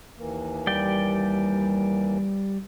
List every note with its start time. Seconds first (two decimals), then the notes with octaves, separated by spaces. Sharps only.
0.17 D#2 E3 A#3
0.67 G3 D5 G5